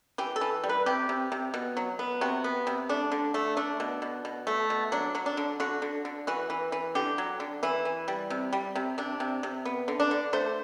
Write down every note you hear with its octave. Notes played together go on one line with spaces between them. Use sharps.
E3 G4
A4
E3
G3
B4
C3 G4
C3
C3
B2
F#3
B3
C3 F#4
B3
C3
A3 D4
D3
A3
A3 D4
B2
B2
B2
A3
B2
F#3 D4
F#3
D4
D3
D3 F#4
D3
D3
E3 F#4
E3
E3
D3 G4
F#3
D3
E3 E4
E3
G3
C3
G3
C3
C3 D4
C3
C3
B3
D3
D4
D3
A3 C5